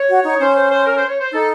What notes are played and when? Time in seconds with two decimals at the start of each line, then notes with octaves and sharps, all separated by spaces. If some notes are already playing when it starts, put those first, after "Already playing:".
Already playing: C#5
0.09 F#4
0.24 D#4
0.39 C#4 C5
0.56 C5
0.70 C5
0.86 A#4
0.97 C5
1.09 C#5
1.20 C5
1.32 D#4 A4